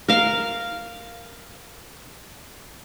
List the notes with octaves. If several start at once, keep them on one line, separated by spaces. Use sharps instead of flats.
A#4 F5